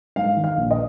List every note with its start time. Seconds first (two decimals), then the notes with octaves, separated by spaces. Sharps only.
0.16 G#2 F5
0.36 D#3
0.44 F5
0.57 A#1
0.71 D#5